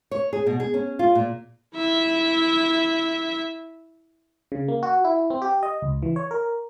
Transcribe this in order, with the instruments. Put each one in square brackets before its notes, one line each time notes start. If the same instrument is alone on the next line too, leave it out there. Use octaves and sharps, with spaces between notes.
[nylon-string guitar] C#5
G#4
B2
G#4
C#4
F4
A#2
[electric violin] E4 E5
[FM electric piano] C#3
A#3
F#4
E4
C4
G4
D#5
C#2
E3
C#5
A#4